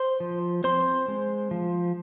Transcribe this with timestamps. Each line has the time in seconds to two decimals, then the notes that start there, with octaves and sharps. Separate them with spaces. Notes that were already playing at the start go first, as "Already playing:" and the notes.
Already playing: C5 C6
0.20 F3
0.64 C4 C5 C6
1.08 G#3
1.51 F3